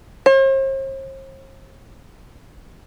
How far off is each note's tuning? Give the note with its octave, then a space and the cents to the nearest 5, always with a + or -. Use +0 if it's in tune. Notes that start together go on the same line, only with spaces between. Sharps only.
C5 +45